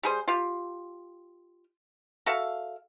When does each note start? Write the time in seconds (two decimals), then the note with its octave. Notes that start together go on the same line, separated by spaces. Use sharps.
0.03 G3 G#4 C5
0.28 F4 G4
2.26 F#4 A4 E5 F5